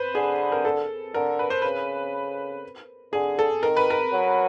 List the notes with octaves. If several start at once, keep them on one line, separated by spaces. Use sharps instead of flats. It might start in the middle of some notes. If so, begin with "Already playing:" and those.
Already playing: B4 C5
D3 G#4
A#4
A4
D3 A#4
B4
C5
C#3 B4
D3 G#4
A4
D#3 A#4
B4
A#4
F#3